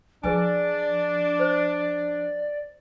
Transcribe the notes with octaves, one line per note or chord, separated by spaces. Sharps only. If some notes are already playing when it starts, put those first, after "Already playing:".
F3 D4 G#4 B4 D5 G#5
C5